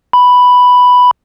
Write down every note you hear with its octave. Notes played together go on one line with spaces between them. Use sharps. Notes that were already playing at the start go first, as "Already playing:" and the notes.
B5